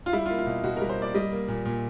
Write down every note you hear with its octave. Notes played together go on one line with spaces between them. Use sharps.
F4
G3 E4
F4
A#3
F4
B2
B2 F#4
G3 A#4
C5
A#3 D5
G3 D#5
A#3
A#2
A#2